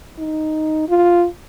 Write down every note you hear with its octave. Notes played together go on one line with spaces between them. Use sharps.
D#4
F4